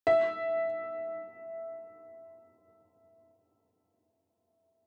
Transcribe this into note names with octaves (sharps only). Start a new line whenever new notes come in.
E5